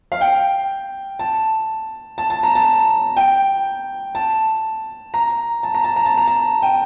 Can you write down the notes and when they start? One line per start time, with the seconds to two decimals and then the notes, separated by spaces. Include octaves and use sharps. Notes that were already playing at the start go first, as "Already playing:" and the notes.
0.12 F5
0.21 G5
1.19 A5
2.18 A5
2.30 A5
2.43 A#5
2.55 A5
3.16 G5
4.15 A5
5.14 A#5
5.63 A5
5.74 A#5
5.84 A5
5.96 A#5
6.06 A5
6.17 A#5
6.27 A5
6.62 G5